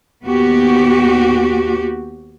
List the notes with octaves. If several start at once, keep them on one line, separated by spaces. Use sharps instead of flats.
D#2 B3 F#4 G4